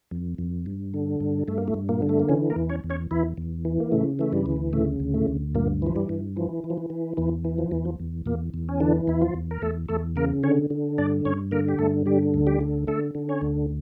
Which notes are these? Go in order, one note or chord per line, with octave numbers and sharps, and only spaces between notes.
F2
F2
G2
D3
G2
G2 A3
A#3
A2 A3
G2
A#2 A#3
D3
A3
A#3
C#3 E3 C#4
A#3 A#4
E2
C#4 C#5
E2
C#4 C#5
E2 E3 E4
E2
E3
A#3
A2 C#3 A3
E3 A3
G2 G3
D2
A2 C#3 A3
D2
A2 A3
D2
G2 A#2 A#3
E3 F3
G2 G3
G2
E3 F3
E3
F3
E3
E3
E2 E3
E3
F3
E2 E3
F3
E2
E2 A#2 A#3
E2
C#4
D3 E3 D4
E2 E4
F3 F4
E2
A#4
E2 A3 A4
E2 A3 A4
C#3 A#3 A#4
D3 C#4 C#5
D3
G2 D4 D5
G2 C#4 C#5
D3 A#3 A#4
G4
G2 A3 A4
D3 G3 G4
D2
G3 G4
D3
D3 A3 A4
D3
C#4 C#5
D2